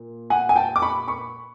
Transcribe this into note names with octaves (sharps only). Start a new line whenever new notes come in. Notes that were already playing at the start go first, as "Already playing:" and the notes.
Already playing: A#2
F#5 G#5
G#5
G5 A5
D6
B5 C#6
B5 C#6